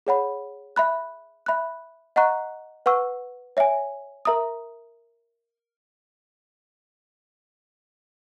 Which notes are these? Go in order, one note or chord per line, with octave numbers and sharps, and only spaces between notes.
G#4 C#5 F#5 B5
E5 B5 F#6
E5 B5 F#6
D#5 F#5 A#5 C#6 F#6
B4 F#5 C#6 E6
C#5 E5 G#5
A#4 E5 A#5 D#6